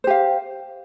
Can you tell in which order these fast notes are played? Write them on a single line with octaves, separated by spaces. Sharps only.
C5 G4 F5